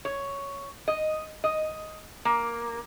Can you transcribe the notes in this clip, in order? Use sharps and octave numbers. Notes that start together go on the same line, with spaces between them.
C#5
D#5
D#5
A#3